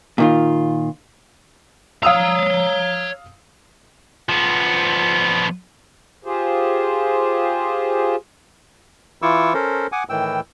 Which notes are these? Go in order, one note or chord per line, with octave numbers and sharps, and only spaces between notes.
A#2 D#3 F4
C#5 F5 A#5 D#6 E6
F3 B3
F4 G4 G#4 C5
E3 E4 F4 C#6 D6 E6
C#4 A4 A#4 C5
F#5 G#5 D6 D#6
A2 D#3 E3 G5 E6